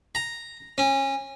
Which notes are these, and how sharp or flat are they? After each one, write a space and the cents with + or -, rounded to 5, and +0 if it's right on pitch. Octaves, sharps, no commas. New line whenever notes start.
A#5 +0
C#4 -25